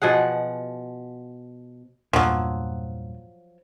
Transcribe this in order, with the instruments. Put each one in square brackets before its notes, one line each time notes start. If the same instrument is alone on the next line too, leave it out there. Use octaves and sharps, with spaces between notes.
[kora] B2 F3 G#4 F#5
[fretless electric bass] E2 G2 A#2 [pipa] F3 F#3